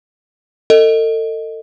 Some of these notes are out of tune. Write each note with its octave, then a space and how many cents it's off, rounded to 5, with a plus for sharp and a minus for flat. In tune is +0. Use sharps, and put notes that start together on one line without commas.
A4 +40 D#5 +0